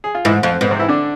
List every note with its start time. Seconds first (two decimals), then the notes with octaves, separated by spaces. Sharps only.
0.04 G#4
0.15 F4
0.25 G#2 E3 E4
0.43 F2 F3 F4
0.61 G#2 B3
0.71 C3 C4
0.79 E3 E4
0.88 D3 D4